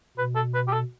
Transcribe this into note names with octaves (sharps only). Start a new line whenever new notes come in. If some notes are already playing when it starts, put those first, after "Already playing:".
B2 B4
A4
B4
G4
A4